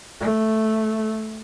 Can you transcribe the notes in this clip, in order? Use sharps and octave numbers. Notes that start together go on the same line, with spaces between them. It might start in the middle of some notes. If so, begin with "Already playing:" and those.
A3